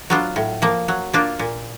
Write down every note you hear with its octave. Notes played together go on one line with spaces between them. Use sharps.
F#3 B3 D4 F4
A2
F3 A#3
F#3
A#3 D4 F4
A#2